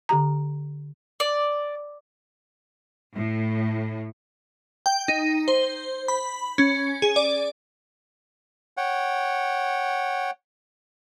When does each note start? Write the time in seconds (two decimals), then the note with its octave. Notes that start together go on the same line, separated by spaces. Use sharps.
0.09 D3 G4 A#5
1.20 D5
3.14 A2
4.86 G5
5.08 D#4
5.48 C5
6.08 B5
6.58 C#4
7.02 G#4
7.16 D5
8.77 C#5 F#5 G5